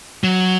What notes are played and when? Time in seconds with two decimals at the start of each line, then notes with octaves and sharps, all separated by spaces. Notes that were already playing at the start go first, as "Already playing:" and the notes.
0.24 F#3